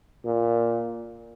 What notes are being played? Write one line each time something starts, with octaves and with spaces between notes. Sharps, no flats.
A#2